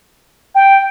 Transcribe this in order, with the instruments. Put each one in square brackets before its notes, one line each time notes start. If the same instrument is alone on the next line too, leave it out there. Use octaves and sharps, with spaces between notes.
[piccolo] G5